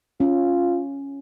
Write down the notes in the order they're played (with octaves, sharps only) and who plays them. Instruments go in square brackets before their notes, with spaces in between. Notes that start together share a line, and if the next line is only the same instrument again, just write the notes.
[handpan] C#4 [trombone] F4